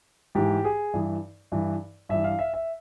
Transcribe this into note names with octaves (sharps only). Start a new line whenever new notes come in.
G#2 E3 G4
G#4
G2 E3
G2 E3
G2 E3 E5
F5
E5
E5